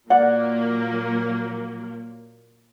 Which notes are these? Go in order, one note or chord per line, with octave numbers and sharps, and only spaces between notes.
A#2 F#3 A#3 D5 F#5